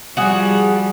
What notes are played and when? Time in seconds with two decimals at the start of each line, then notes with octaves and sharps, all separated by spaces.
0.17 F3 G3 F#4 G#4